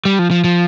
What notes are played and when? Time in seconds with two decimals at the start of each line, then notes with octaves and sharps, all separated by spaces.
0.05 G3
0.19 F3
0.31 F3
0.44 F3